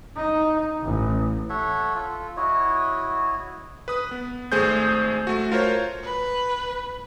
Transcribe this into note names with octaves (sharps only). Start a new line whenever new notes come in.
D#4
A1
A4 C#5 E5 F#5
F4 A4
E4 F#4 C#5 D#5
B4 D#6
B3
G#1 A3 G#4 C5 G6
A3 F#4
F4 A#4 C5 C#5
B4